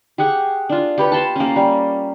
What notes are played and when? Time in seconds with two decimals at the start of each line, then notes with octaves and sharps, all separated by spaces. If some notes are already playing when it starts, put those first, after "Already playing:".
0.18 G4 G#4 F#5 C#6
0.69 D4 F4
0.98 G4 B4 C#5
1.12 A5 B5 C6
1.36 A#3 C#4
1.56 G3